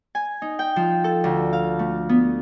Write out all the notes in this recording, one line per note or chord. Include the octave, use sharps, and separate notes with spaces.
G#5
D#4
G5
F3
A4
D2
F5
A3
B3